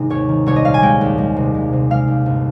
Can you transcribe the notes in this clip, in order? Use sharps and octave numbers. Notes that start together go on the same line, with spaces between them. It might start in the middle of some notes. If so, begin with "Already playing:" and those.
Already playing: G#1 C3 G#3
D#2 C#5
D#3
C2 C#5
D#5
A#2 F5
G#5
G#3 G5
D#2
G#3
C3
G#3
C3
G#3 F5
D#2
G1